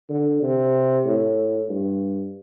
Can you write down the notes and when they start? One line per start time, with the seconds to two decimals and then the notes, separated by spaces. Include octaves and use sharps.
0.10 D3
0.42 C3
1.06 A2
1.69 G2